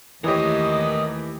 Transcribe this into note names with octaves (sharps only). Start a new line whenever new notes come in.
D#2 E3 A3 G4 A#4 C#5 D#5 D#6